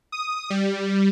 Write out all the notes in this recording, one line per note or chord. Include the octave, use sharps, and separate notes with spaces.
D#6
G3